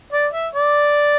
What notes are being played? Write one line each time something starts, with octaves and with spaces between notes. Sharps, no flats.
D5
E5
D5